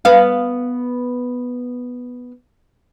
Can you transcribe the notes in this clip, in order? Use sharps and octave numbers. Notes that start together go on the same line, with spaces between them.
B3 F5